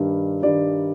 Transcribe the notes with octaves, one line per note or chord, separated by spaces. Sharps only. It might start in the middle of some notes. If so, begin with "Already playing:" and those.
Already playing: G2 D#3 G3
G2 D#3 G3 D5